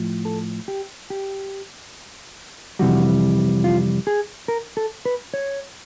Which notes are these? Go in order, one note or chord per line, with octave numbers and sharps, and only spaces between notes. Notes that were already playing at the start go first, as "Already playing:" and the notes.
Already playing: A2 F3
A4
G4
G4
F2 C3 E3 G3 F#4
F4
G#4
A#4
A4
B4
C#5